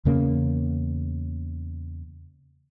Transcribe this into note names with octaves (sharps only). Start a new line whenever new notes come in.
E2 C#3 A#3 C#4